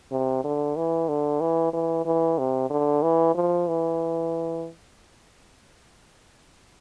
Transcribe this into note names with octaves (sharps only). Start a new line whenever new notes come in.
C3
D3
E3
D3
E3
E3
E3
C3
D3
E3
F3
E3